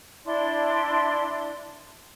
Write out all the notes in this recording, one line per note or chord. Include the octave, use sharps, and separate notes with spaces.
D4 E4 D5 C6